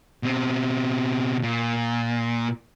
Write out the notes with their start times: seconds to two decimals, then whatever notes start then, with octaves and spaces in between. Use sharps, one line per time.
0.23 B2 C4
1.43 A#2